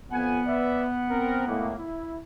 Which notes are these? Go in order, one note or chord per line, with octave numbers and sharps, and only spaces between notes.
F2 B3 F#5 G#5
B4 D5 E5
C4 A#4
A2 G#3 A#3
E4